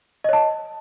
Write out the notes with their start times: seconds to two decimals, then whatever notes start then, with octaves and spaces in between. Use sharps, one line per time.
0.24 D#5
0.29 C#5
0.33 A5